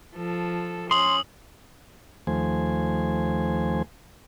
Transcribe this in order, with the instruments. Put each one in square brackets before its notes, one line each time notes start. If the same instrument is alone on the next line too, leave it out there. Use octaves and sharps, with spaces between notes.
[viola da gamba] F3 A4
[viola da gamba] C#4 [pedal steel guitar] C6 [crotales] D#6 F#7
[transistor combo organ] D#2 F3 A3 C5 G#5